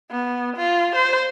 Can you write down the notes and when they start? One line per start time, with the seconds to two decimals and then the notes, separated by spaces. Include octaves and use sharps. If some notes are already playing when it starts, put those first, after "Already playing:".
0.11 B3
0.57 F4
0.96 C5